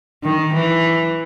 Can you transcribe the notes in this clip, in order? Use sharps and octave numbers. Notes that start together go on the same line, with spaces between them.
D#3
E3